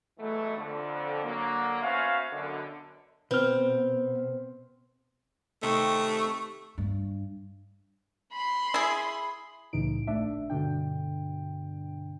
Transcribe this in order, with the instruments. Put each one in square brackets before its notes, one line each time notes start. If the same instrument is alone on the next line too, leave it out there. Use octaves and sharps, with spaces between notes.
[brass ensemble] B2 E3 F#3 G#3 A3
F2 D3
D3 F#3 A#3
B3 C#4 F#4 C5 E5 F5
F#2 B2 D3
[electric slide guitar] B2 [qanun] C4 [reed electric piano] B4 F6
[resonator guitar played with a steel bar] C3 D#3 C4 [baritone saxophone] A3 [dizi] C#6
[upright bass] G2
[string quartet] B5 C6
[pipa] E4 G#4
[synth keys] C2 A2 C#3 E3 D#4 D7
G#1 A3 D4 E5
G2 B2 D3 D4 G5